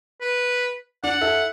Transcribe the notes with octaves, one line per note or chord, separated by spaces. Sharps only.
B4
D4 F#5
E4 A4